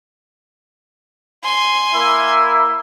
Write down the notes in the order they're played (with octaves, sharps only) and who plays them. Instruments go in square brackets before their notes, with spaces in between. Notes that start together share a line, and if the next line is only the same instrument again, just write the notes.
[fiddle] G#5 C6
[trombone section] A#3 E4